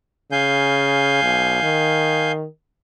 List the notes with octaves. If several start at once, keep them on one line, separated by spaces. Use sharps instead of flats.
C#3 F5 G#5 G6
B1
D#3